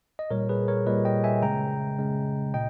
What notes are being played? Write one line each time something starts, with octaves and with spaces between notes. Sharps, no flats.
D#5
A#2 G3 A#4 C#5
G#4 B4
A#4 C#5
A#2 G3 B4 D#5
D#5 G5
E5 G#5
C#3 G#3 G5 A#5
C#3 G#3
A#2 D#5 G5